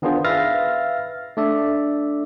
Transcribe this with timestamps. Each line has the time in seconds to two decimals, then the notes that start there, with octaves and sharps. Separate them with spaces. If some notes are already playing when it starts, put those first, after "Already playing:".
0.02 D#3 B3 D4 F4 G#4 C5
0.24 B4 E5 F5 F6 A6 A#6
1.37 A3 D4 D5 E5